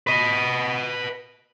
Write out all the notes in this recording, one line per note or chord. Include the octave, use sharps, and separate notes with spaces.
B4 D#5